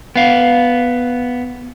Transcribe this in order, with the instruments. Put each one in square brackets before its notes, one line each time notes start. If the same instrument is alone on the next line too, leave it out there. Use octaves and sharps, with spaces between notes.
[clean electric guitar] B3 F5